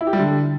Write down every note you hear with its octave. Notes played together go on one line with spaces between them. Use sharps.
E4
G4
G3
D3